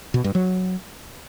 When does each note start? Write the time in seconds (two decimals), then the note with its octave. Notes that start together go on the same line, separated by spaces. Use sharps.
0.14 B2
0.24 G2
0.35 F#3